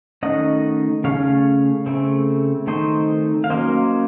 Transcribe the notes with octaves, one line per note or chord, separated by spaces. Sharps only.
D#3 A3 C#4 D#5 F#5
C#3 A3 C#4 C#5 F5
C#3 A3 C4
D#3 A3 C4 C5 D#5
F5
F#3 A#3 C#4 C5 D#5